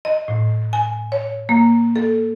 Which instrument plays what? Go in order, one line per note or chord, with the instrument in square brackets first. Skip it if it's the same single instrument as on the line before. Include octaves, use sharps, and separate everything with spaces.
[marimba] D#5
A2
G#5
C#5
A#3
A4